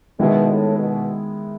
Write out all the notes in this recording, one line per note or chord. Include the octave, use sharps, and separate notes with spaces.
B2 D#3 G#3 B3 E4
A2
B2